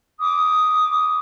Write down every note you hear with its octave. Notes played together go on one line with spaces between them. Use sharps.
D6 D#6